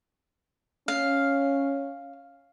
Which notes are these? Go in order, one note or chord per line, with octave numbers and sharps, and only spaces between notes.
C#4 F5